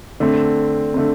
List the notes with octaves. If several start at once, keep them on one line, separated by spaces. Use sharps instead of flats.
D3 A3 C4
D3 A3 C4